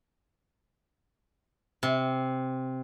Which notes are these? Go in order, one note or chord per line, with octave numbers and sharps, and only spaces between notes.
C3